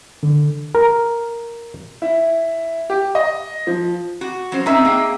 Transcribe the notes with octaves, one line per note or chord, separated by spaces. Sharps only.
D3
A#4
E4
G4
D#5
F3
F#4
F#3 C#4 C5
C4 C#4 D#4 E5
A#3 G#4 G5